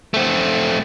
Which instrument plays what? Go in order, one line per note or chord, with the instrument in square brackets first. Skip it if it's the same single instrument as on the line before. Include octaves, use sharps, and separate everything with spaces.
[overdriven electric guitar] A3 C4